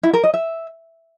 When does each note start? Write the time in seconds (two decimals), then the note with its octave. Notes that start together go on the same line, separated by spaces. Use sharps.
0.03 E4
0.13 A#4
0.24 D#5
0.34 E5